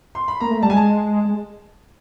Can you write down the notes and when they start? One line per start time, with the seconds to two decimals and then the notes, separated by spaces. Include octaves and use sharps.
0.15 C6
0.28 B5
0.40 A#3 A#5
0.51 A3
0.62 G3 A5
0.70 G#5
0.73 G#3 A5
1.25 G#3